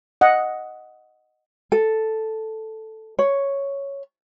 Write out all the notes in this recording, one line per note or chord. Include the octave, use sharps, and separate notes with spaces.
D#5 F#5
A4
C#5